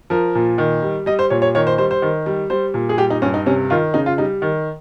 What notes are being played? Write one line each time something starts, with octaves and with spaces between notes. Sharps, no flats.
F3 A#4
A#2
D#3
G3
G3 D#5
C5
A#2 C#5
C#5
D#3 C#5
C5
G3 C5
C5
D#3
G3
G3 C5
A#2
G#4
G3 G4
D#4
G2 C#4
D#4
C3 C#4
D#3 F4
C#3 D#4
F4
G3 D#4
D#3